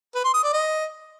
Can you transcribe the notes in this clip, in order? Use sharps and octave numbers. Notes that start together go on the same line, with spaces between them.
B4
C6
D#6
D5
D#5